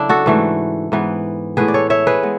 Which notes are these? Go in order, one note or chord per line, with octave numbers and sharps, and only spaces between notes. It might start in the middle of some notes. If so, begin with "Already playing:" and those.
Already playing: C#3 F#3 A3 D4 E4
F#4 A4
G#2 E3 A3
G#2 E3 B3
A2 G#3 B3 G#4 B4
D5
A4 C#5
C#5 E5
G#4 B4
G#3 B3